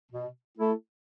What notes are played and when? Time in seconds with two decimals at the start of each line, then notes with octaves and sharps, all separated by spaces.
0.11 B2
0.57 A3 E4 A4